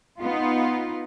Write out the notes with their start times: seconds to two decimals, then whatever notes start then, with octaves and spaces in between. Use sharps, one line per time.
0.17 B3 D#4 F4